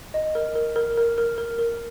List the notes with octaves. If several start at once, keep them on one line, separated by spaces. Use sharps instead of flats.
D#5
A#4
A#4
A#4
A#4
A#4
A#4
A#4